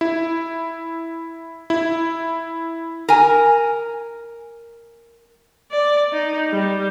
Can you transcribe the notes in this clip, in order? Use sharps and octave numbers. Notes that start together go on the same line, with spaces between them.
E4
E4
A#4 G#5
D5
D#4
G3